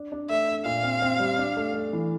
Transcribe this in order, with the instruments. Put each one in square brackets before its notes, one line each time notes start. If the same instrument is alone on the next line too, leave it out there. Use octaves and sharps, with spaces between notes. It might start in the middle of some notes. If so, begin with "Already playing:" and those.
Already playing: [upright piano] D4
D4
[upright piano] A3 [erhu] E5
[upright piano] D4
[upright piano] A#2 [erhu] F5
[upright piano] C4
C4
G3
D4
A3
A3
E3